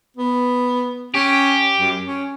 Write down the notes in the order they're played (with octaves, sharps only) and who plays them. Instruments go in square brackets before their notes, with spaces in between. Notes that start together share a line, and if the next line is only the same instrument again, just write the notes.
[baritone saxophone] B3
[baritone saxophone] C#4 [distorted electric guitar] G4
[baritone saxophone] F#2
C#4